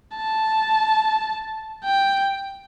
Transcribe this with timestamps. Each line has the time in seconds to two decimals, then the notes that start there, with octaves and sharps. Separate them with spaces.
0.17 A5
1.84 G5